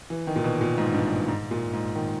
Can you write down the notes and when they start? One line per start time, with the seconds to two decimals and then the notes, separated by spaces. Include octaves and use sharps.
0.10 E3
0.27 D#3
0.36 A#2
0.44 B2
0.61 A#2
0.78 G#2
0.94 G2
1.28 G#2
1.51 A#2
1.73 G#2
1.95 D#3